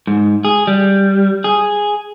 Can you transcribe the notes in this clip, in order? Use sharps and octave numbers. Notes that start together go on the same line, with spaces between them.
G#2
G#4
G3
G#4